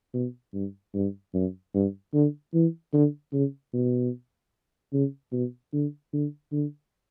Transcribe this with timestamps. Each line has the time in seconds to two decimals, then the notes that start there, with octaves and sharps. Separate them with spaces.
0.14 B2
0.54 G2
0.95 G2
1.34 F#2
1.74 G2
2.14 D3
2.54 E3
2.94 D3
3.33 C#3
3.74 B2
4.93 C#3
5.33 B2
5.73 D3
6.13 D3
6.52 D3